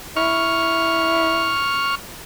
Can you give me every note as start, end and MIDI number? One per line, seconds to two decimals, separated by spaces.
0.16 1.62 64
0.16 1.95 85
0.16 1.95 89